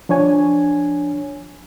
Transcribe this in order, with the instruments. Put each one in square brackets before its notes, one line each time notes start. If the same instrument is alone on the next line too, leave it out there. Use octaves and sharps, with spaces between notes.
[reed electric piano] F3 D4 C#5 G#5